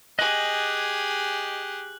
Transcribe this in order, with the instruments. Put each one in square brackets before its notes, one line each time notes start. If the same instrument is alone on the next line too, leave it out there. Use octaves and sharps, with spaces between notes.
[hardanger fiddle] G4 G#4 [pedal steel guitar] D#5 G#5 [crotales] F#6 F#7